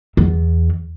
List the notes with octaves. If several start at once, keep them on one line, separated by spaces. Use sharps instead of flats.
E2